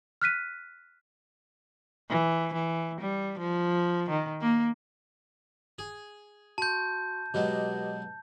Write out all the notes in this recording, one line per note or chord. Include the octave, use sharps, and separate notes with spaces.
F6 F#6 B6 D#7
E3
E3
G3
F3
D#3
A#3
G#4
F#4 A5 C6 G6
B2 F#3 G#3 G4 B4 D#5